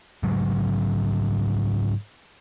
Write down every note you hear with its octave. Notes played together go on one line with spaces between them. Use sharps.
G#2 C#3 F#3 G#3